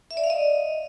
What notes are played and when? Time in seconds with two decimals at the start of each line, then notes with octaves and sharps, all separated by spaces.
0.11 E5
0.17 D5
0.24 F5
0.30 D#5